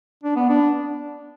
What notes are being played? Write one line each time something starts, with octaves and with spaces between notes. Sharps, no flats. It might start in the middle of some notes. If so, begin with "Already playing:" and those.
D4
B3
D4